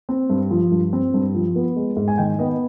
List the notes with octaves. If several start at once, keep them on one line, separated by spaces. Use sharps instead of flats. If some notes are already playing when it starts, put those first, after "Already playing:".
C4
G2
F3
G2
C4
G2
F3
B3
G#3
G#2
G#5
D#3 G5
B3 D#5